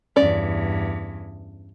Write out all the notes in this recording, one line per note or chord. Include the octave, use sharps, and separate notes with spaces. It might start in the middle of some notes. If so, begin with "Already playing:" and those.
E2 G2 C#4 D5